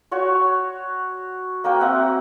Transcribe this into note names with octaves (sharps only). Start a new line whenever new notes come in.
F#4 C#5 C#6
A#3 F#4 B4 G5
C4 F#4 E5 F#5